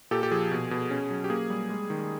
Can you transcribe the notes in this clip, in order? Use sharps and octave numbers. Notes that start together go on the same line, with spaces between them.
A#2 G4 A4
G4
F3 G#4
B2
B2
C#4
F#3
G4
A#3 G#4
G3
G#3
D#3